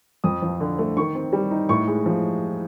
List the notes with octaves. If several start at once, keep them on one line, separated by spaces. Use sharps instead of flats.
F2 D#6
F3
D3
A3
D#3 C#6
C4
G3
D#4
A2 C#6
G#3
F3